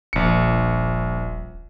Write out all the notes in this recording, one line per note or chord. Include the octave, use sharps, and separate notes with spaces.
D#1 A#1 C#7